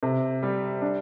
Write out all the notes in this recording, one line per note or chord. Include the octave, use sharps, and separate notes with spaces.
C3
G3
D4